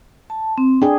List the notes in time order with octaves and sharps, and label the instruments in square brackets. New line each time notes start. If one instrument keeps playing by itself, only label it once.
[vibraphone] A5
C4
[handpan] D4 G#4 [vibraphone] G5